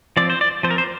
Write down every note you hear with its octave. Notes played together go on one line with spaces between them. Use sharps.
F3 C4 D5
C5
D5
F3 C4 C5
A#4
C5